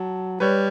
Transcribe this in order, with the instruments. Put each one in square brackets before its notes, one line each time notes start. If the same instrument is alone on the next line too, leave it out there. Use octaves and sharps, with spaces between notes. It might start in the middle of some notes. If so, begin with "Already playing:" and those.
Already playing: [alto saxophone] F#3 [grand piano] A5
[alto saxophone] G3 [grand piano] B4 C#5